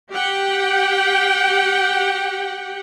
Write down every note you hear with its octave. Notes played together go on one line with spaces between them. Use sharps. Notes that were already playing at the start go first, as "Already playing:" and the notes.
G4 F#5 G5